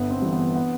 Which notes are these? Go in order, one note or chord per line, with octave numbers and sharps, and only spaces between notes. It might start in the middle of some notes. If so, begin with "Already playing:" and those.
Already playing: G1 B3
C4
G2 E3
B3
B3